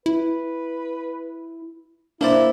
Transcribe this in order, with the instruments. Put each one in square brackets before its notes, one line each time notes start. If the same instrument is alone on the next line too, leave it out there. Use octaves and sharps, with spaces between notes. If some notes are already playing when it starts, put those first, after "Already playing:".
[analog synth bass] E4 [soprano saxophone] B4
[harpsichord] A#3 C5 D5 [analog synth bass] D4 [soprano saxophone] E4